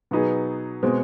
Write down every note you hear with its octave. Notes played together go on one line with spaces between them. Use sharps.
B2 F#3 B3 D#4 G#4
B2 G#3 C4